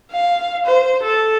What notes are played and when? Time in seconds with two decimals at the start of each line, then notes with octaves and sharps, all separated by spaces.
0.11 F5
0.66 C5
1.03 A4